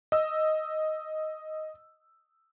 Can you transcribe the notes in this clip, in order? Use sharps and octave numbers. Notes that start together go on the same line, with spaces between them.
D#5 E6